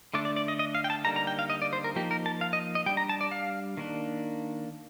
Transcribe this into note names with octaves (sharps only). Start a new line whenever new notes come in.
D3 A3 D4 D5
D5
D5
D#5
D#5
F5
G5
A5
D3 G3 A#3 D#4 A#5
A#5
G5
F5
D#5
D5
C5
A#4
F3 A#3 D#4 G4
A#4
A5
F5
D#5
D#5
G3 D4 G5
A#5
A5
D5
F5
D#3 A#3 D4